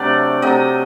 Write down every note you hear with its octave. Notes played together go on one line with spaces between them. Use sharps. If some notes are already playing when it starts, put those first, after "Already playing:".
Already playing: C3 F#3 A3 D4 D5
C3 F#3 A3 D#5